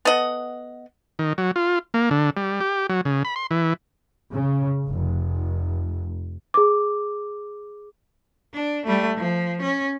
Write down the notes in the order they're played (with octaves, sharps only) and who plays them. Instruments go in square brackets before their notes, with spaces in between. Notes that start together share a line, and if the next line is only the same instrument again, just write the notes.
[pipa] B3 A4 D#5 F#5
[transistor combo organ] D#3
F#3
F4
A#3
D3
G3
G4
F#3
C#3
B5
C6
E3
[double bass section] C#3
F1
[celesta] G#4 D6
[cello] D4
G3 A3
F3
C#4